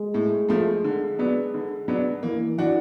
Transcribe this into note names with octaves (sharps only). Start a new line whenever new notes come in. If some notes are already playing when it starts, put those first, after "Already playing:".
Already playing: G#3
A2
F3 A3
D3
F#3 B3 D4
D3
F#3 B3 D4
E3 A#3
E3 D4 F#4